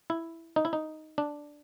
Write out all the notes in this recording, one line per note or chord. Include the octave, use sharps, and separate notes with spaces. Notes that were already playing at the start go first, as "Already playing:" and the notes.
E4
D#4
E4
D#4
D4